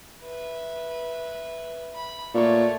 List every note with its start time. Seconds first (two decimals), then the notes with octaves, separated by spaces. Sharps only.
0.22 B4 E5
1.94 B5
2.34 A#2 A3 C#5